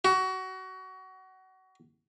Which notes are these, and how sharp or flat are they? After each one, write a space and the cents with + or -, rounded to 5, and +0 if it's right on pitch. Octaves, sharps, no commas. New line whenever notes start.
F#4 +25